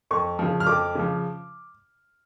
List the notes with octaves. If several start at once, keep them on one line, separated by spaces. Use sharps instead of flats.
F2 C#6
C#3 F3
F6
F2 D6
C#3 F3